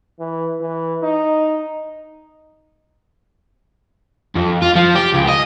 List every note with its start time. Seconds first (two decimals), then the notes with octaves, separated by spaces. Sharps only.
0.19 E3
0.60 E3
1.03 D#4
4.35 F2
4.62 F4
4.76 F3
4.95 G4
5.14 C#2
5.29 D#5